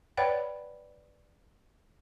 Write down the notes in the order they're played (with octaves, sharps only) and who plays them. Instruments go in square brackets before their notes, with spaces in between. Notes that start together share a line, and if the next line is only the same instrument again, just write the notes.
[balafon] B4 C#5 D5 F#5 G5 B5